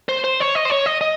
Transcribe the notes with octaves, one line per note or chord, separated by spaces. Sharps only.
C5
C5
C#5
D#5
C5
C#5
D#5
D#5